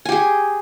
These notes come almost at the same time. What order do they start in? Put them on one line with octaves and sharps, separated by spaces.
G#5 G4 G#4